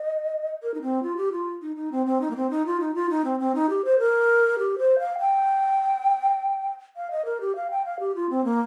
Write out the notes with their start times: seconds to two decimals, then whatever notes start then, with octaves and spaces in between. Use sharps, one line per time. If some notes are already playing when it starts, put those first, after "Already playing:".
Already playing: D#5
0.63 A#4
0.74 D#4
0.82 C4
1.03 F4
1.17 G4
1.32 F4
1.62 D#4
1.76 D#4
1.92 C4
2.06 C4
2.21 D#4
2.31 A#3
2.36 C4
2.50 D#4
2.66 F4
2.80 D#4
2.95 F4
3.10 D#4
3.24 C4
3.40 C4
3.55 D#4
3.70 G4
3.85 C5
3.99 A#4
4.59 G4
4.78 C5
4.99 F5
5.19 G5
6.96 F5
7.11 D#5
7.25 A#4
7.41 G4
7.56 F5
7.71 G5
7.85 F5
8.00 G4
8.15 F4
8.30 C4
8.45 A#3